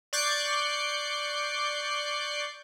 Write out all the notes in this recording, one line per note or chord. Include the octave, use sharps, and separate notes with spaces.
D5 C#6 D6 F#6 G6 C7